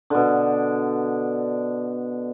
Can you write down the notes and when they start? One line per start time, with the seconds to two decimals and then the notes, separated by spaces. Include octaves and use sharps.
0.10 B2 D3